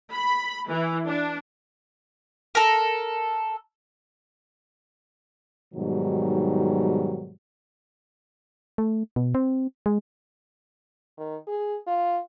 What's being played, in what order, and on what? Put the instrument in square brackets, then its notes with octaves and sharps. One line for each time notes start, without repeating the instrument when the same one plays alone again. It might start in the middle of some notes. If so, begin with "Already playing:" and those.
[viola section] B5
E3
D4
[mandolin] A4 A#4
[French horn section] G#2 B2 D#3 F#3 G3
[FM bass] A3
B2
C4
G#3
[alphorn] D#3
G#4
F4